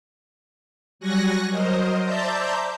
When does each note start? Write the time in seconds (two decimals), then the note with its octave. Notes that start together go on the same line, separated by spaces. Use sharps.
0.99 F#3 G3 G#5 C#6 F#6 A#6
1.49 F#3 A#4 C5 D#5
2.03 C5 D5 E5 A5 A#5 G6